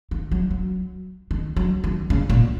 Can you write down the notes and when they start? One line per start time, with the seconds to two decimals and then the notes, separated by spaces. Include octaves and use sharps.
0.11 D#3
0.31 F#3
0.51 F#3
1.31 D#3
1.56 F#3
1.84 D#3
2.10 C#3
2.30 A#2